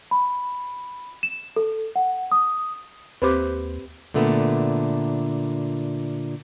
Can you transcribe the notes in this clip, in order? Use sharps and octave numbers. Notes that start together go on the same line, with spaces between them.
B5
E7
A4
F#5
D#6
D#2 C4 G4 B4 C5 D6
A#2 D3 A3 B3